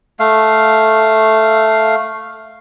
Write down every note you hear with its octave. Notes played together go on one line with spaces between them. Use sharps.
A3 F5